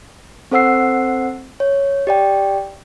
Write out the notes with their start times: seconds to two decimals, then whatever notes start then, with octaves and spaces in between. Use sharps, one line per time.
0.51 C4 A4 C5 F#5 E6 C7
1.60 C#5
2.07 G4 D5 G5